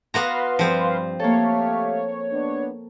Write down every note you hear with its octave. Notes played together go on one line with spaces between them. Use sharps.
B3 F#4 B4 F5 A#5 C6
G2 F3 C4
A3 A#3 G4 A4 C#5 F5
B3 D4